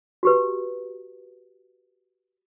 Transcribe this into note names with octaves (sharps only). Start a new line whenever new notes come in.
F#4 G4 B4